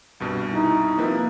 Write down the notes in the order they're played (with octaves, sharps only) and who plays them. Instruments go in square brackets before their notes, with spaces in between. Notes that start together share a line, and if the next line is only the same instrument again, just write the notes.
[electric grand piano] C2 G2 B2
[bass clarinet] D#4 [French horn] E4
[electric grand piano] C3 F3 B4 [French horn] A#3